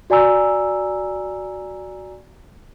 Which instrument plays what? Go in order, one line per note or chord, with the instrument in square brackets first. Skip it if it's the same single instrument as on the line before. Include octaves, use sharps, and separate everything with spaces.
[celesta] F#4 D5 G#5 A#5 E6